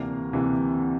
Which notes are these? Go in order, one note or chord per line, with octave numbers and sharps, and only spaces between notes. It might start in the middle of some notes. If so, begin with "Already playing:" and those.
Already playing: D2 C3 E3 A#3 D4
D2 C3 E3 A#3 D4